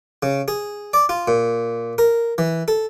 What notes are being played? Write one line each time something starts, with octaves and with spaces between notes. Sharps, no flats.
C#3
G#4
D5
F4
A#2
A#4
E3
A4